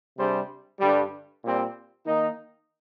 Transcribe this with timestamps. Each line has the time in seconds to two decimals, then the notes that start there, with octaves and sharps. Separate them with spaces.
0.17 C3 G3 D4 G#4 C5
0.80 G2 D3 G3
1.43 A#2 G3 C4
2.06 D#3 A#3 D#4